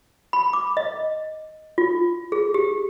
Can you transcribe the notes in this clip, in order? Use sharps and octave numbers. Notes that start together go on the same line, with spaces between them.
B5
D6
D#5
F4
G#4
G4